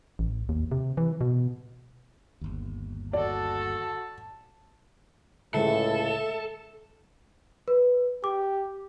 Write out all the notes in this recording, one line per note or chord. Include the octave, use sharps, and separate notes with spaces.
A1
D#2
C3
E3
B2
G1 D#2
F#4 A4 D5 A5
C#2 A2 D3 G#3 A4 E5
B4
G4 D6